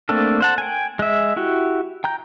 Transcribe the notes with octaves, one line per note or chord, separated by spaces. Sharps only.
A3 A#3 C4 D4 A4
C5 F#5 A5
G5 G#5
G#3 E5
E4 F#4 G4
G5 A#5 G6